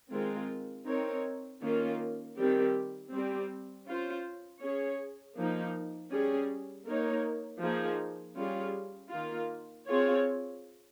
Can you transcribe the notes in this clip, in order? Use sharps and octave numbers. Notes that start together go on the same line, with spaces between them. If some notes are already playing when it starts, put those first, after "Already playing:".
D#3 G#3 C4 F4 A#4
C4 D#4 A#4 C#5
D#3 A#3 C#4 F4
D#3 G3 C4 G4
G3 C4 G4
C#4 F4 C5
C#4 G#4 C#5
F3 A#3 D#4
G3 C#4 G#4
A#3 D#4 A#4 C#5
F3 A#3 D#4 G#4
G3 C#4 F4 G#4
D#3 A#3 F4
C4 F4 G#4 C#5